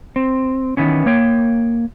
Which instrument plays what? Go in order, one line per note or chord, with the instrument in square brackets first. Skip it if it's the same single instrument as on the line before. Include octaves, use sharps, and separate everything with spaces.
[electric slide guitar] C4
D#3 E3 B3 C#4
A#3 C#5 G5